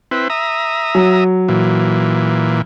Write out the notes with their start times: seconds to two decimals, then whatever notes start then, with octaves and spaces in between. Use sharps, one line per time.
0.11 C4 E4 B4
0.30 E5 A#5 D#6
0.95 F#3
1.49 A#2 E3